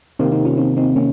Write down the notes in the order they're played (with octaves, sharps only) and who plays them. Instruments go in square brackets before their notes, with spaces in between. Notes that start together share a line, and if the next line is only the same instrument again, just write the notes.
[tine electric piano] C3 D#3 A#3 [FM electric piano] C4 D#4
[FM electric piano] C4 D#4
C#4 F4
C4 D#4
C4 D#4
A#3 C#4